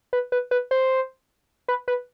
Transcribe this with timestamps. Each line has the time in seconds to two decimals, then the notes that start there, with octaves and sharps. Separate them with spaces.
0.13 B4
0.32 B4
0.51 B4
0.71 C5
1.68 B4
1.88 B4